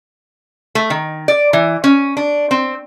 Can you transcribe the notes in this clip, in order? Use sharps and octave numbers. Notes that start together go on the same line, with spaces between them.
A3
D#3
D5
E3
C#4
D4
C4